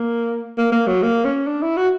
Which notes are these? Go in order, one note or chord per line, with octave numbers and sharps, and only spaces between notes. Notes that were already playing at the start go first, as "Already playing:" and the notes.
Already playing: A#3
A#3
A#3
F#3
A#3
C#4
D4
E4
F#4